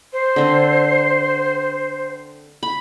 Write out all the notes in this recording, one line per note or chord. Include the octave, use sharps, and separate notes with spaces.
C5
D3 C4
B5